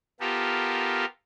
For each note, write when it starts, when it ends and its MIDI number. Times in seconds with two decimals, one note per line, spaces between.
0.20 1.05 59
0.20 1.05 65
0.20 1.05 67
0.20 1.05 69
0.20 1.05 70